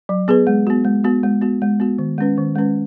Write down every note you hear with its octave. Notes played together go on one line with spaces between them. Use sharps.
F#3
B3 G#4 B4
G#3
B3 F#4
G#3
B3 F#4
G#3
B3 F#4
G#3
B3 F#4
D#3
G#3 C#4 B4
D#3
G#3 C#4 B4